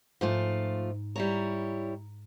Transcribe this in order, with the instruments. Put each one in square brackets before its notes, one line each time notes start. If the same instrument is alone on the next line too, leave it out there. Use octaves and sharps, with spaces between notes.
[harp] G#2 [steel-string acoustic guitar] F3 A3 F4
[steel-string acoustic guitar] G3 E4 C#5 [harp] A#5